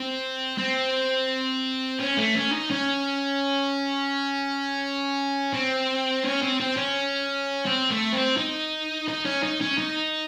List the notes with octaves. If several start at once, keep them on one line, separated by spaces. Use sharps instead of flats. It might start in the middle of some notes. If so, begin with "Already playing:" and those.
Already playing: C4
C4
C#4
A3
C#4
D#4
C#4
C4
C#4
C4
C4
C#4
C4
A3
C4
D#4
D#4
C#4
D#4
C#4
D#4